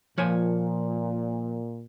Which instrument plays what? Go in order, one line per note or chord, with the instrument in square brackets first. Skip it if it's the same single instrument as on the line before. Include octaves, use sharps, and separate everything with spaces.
[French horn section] A#2 [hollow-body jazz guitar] F3 C#5 G#5